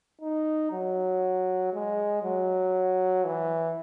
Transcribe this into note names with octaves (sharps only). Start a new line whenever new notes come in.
D#4
F#3
G#3
F#3
E3